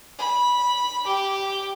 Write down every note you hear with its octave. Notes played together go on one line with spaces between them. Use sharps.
B5
G4